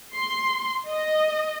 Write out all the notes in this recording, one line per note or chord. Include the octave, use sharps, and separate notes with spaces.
C6
D#5